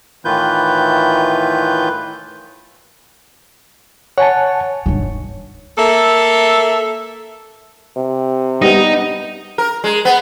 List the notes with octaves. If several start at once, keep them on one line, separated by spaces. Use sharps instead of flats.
A2 D#3 E3 F4 B4 G6
C#5 F#5 G#5 A5
G1 D2 D#3
A#3 A4 E5
C3
G3 B3 D#4 G4
A#4
G#3
B3